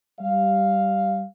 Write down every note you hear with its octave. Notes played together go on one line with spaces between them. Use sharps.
G3 F5